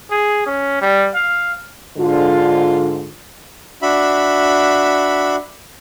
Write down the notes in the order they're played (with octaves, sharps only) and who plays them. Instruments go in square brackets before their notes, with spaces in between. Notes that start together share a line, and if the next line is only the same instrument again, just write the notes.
[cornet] G#4
C#4
G3
F5
[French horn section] G#2 D3 F4
[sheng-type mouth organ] D4 F#4 E5 B5